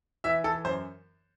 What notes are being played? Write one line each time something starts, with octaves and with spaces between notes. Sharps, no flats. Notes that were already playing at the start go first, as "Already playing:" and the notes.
E3 E5
E3 A4
F#2 C5